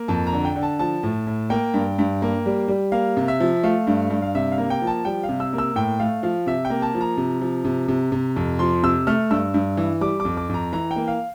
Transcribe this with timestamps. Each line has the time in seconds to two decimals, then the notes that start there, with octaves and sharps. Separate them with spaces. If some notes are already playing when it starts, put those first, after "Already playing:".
Already playing: A#3
0.08 F2 A5
0.27 A#5
0.33 D3
0.45 G5
0.56 D3
0.63 A5
0.79 F3 A5
1.03 A2
1.27 A2
1.50 A#3 G5
1.74 G2
1.99 G2
2.22 A#3
2.46 G3
2.68 G3
2.92 A#3 F5
3.17 C3
3.28 E5
3.40 F3
3.63 A3 F5
3.87 G2
4.10 G2
4.22 F5
4.35 C3 E5
4.52 F5
4.58 A#3
4.70 G5
4.82 F3
4.87 A5
5.05 G3 G5
5.23 F5
5.29 C3
5.40 E6
5.53 A#3
5.58 E6
5.76 A2 G5
6.00 A3 F5
6.23 F3 F5
6.46 C3 E5
6.65 G5
6.70 A#3
6.82 A5
6.95 F3
7.01 A#5
7.17 C3
7.41 F3
7.65 C3
7.88 C3
8.12 C3
8.36 F2
8.59 F3 C6
8.83 C3 E6
9.07 A3 F6
9.30 G2 E6
9.54 G2
9.77 E3
10.01 G3 D6
10.20 D6
10.25 F2
10.37 D6
10.49 F2 A#5
10.72 E3 A#5
10.91 G5
10.96 A#3
11.08 F5